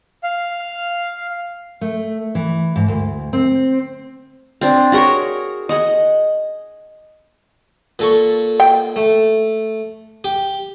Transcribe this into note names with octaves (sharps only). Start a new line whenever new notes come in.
F5
A3
E3
G#2
D2
C4
C4 D4
F#4 G#4 A#4 C#5
D#5 F#5 G#5
A#2 A4 C#6
G5
A3
G4